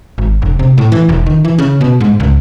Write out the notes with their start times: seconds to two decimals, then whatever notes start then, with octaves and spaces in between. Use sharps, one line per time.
0.18 G#1
0.42 F1
0.59 C3
0.78 A2
0.92 E3
1.09 E1
1.26 D#3
1.45 E3
1.58 C#3
1.81 B2
2.00 G#2
2.20 C#2